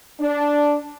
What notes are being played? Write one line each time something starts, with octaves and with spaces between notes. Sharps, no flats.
D4